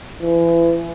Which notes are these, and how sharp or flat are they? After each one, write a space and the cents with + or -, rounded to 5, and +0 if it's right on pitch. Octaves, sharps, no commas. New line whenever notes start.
E3 +30